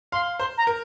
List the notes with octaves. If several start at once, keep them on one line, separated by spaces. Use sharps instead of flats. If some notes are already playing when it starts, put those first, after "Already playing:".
F5 C6
C5 C6
A#5
A#4